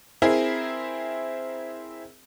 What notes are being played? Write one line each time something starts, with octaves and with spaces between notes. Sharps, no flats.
C4 E4 G#4 A#4